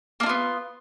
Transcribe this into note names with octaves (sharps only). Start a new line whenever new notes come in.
A#3 B3 D4 F4